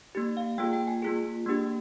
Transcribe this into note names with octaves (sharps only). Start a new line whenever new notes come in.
A#3 D#4 G4
F5
A#3 F4 G#4 G5
G5
G#5
A#3 F4 G#4
A#3 D4 G4